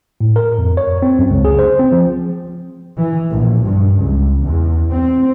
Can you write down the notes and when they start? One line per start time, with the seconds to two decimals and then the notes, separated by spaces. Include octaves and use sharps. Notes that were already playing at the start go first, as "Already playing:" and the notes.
0.21 A2
0.36 A#4
0.59 F2
0.77 C#5
1.02 C4
1.19 F#2
1.31 C#2
1.45 G#4
1.59 C5
1.79 C4
1.92 F3
2.98 E3
3.30 A#1
3.64 G2
3.98 C#2
4.44 E2
4.91 C4